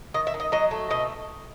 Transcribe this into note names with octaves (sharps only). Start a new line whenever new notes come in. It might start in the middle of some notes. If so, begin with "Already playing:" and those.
D#3 D#5
E5
D#3
D#5
F#3 D#5
A3
B2 D#5